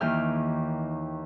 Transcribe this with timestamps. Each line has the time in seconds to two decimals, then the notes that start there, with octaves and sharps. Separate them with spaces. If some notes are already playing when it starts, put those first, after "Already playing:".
0.01 D#2 D#3 E3 G5 F6